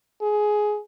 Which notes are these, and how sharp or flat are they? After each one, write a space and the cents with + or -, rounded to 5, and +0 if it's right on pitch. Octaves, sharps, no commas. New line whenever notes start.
G#4 +15